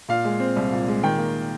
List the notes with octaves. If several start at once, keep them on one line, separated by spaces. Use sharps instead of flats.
A#2 F5
G#3
C4
C2
A#2
G#3
D#3 G5
A#3